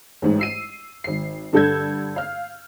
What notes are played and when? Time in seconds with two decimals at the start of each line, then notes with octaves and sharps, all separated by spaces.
0.22 A1 G#2
0.39 E6 C7 D#7
1.04 G#1 C7
1.53 G2 D3 A4 E6 G6 G#6
2.16 F5 F6